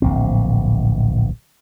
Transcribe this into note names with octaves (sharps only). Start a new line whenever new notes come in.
D1 A#1 C4